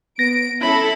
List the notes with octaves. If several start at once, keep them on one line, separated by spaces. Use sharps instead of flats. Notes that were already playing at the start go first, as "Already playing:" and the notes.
B3 A#6 D7
C#4 E4 A4 B5